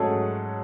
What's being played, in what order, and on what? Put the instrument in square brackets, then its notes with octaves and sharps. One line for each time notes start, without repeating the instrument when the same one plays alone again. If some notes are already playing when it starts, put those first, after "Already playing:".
Already playing: [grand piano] G#2 F#3 A3 C#4 G#4 A4